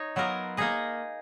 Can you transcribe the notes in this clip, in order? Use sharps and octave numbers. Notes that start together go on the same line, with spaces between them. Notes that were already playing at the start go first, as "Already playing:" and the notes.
Already playing: D#4 C#5
F#3 B3 F4 A#4
A#3 D#4 G#4 D#5